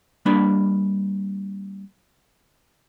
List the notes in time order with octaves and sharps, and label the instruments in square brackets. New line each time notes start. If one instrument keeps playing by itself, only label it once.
[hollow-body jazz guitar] G3 A#3 D4 B4 B5